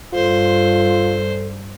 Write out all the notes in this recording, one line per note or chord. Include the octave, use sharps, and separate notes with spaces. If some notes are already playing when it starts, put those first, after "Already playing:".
G2 F4 A4 C5